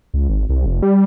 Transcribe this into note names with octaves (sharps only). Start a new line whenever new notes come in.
C#2
G#1
C2
F1
G3